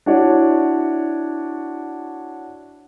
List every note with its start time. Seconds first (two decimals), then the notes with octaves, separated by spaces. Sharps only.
0.06 D4 E4 F#4 C#5 D5